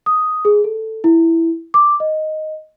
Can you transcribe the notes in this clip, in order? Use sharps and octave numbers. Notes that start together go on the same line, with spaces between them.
D#6
G#4
A4
E4
D6
D#5